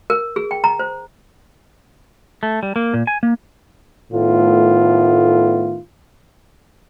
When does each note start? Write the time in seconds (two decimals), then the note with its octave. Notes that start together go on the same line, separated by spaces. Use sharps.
0.10 A#4
0.36 G#4
0.51 G5
0.64 A#5
0.79 C5
2.43 A3
2.63 G3
2.76 A#3
2.94 A#2
3.07 G#5
3.23 A#3
4.13 A2 D#3 A3 B3 F4